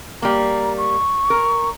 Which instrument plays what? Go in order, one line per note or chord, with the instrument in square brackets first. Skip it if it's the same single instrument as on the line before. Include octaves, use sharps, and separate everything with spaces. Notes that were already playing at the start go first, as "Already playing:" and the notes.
[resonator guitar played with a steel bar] G3 A#3 [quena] A#5
[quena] C#6
[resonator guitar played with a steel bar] A#4